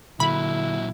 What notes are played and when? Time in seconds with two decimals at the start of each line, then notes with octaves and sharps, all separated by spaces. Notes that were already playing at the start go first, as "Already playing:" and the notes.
0.20 A#2 D3 F#3 E4 B5